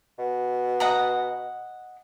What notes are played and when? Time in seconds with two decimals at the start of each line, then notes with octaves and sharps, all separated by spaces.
0.18 B2
0.80 D#5 F#5 A#5